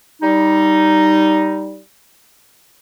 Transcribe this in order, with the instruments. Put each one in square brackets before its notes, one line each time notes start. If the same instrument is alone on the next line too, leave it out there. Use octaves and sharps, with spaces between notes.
[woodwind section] G3 D#4